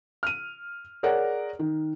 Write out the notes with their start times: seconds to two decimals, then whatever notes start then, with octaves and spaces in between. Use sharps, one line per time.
0.23 F6 D#7
1.03 G#4 A#4 C#5 D5 F#5
1.59 D#3